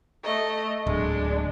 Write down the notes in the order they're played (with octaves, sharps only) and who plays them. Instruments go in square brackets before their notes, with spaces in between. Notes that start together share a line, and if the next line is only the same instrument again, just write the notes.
[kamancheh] A3 D#5
[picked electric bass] D1 [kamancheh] G#3 D4